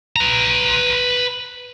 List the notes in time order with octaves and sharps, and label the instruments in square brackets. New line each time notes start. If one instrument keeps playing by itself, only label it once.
[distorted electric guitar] B4 A#5